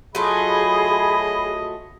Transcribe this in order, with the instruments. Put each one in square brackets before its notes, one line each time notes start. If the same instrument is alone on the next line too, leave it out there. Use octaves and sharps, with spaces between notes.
[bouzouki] F#3 A3 F4 [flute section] G#4 B5 [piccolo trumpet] D#5